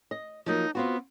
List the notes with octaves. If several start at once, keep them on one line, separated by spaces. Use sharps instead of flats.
D#5
F3 F#3 A#3 D#4
B3 C4 F4 F#4